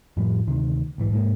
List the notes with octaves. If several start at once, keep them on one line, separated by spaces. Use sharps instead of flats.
F2 A2 F3 G3
D2 C3 D#3
B1 G#2 E3
G#2 G#3 A#3